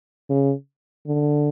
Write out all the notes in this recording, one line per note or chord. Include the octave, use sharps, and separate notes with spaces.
C#3
D3